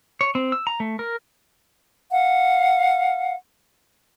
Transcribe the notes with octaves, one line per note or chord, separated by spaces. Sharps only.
C#5
C4
E6
A#5
A3
A#4
F5 F#5